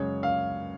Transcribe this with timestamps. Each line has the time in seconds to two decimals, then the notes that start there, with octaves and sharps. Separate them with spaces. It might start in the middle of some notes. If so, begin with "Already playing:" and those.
Already playing: F#2 C#3 G#3 C#5
0.23 F5